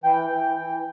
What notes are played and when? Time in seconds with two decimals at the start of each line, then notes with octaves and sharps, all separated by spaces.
0.04 E3 G5
0.30 E3
0.56 E3